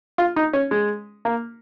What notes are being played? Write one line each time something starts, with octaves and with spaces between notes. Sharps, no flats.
F4
D#4
C#4
G#3
A#3